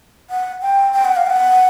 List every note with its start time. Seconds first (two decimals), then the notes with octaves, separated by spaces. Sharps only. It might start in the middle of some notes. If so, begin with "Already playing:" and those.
0.30 F#5
0.62 G5
0.94 G5
1.05 F#5
1.16 F5
1.26 G5
1.30 F#5